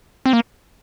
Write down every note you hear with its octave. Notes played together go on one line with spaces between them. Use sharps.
C4
A#3